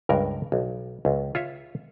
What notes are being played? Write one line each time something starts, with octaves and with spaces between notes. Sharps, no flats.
C#2 G2 A#4
B1
C#2
F4 C#5 E5